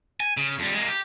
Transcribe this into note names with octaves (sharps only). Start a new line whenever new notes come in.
G#5
C#3
F2 G3
G#3 A#3
G4